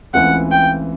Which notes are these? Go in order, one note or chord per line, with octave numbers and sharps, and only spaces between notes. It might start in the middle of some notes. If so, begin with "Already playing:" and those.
C#2 C#3 E3 A3 C4 F#5
G5